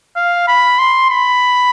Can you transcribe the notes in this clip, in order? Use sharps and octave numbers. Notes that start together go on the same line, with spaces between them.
F5
B5
C6
B5